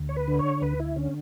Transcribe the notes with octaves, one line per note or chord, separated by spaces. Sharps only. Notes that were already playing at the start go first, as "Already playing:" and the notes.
Already playing: D2
C#5
B4
D3
C#5
D2 B4
E4
D3 C#4